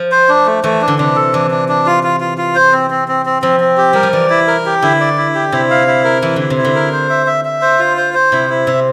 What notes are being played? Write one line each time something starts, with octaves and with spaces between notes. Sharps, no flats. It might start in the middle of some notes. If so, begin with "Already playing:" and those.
Already playing: F3
C5
D4
A3
E3 A3
D4
D3
C3 D4
A4
E3 D4
D4
D4
F4
F4
F4
F4
C5
C4
C4
C4
C4
F3 C4
C4
G4
G3 A#4
F3
E3 D5
E4
A#4
G4
D3 E4
D5
E4
G4
C3 E4
F5
E4
A#4
E3 E4
D3 E4
C3
E4
D3
A#4
C5
E5
E5
E5
C5
F4
C5
C5
C3 E4
E4
C3 E5